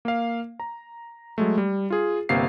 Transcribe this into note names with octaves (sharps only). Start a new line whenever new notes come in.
A#3 F5
A#5
F#3 G#3 A3
G3
F4 G#4
G1 C3 A#3 F5 C7